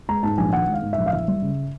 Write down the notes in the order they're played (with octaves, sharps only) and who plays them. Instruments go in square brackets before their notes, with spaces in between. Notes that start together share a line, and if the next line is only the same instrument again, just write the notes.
[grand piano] G#3 A#5
G#2 A5
A#1 G#5
D#3 F#5
G#3
F5
G#2
A#1 E5
F5
E3 E5
G3
C#3